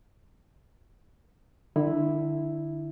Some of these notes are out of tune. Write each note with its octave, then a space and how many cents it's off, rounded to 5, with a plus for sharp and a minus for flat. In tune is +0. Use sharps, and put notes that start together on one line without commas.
D3 +35 E4 +0 E5 +0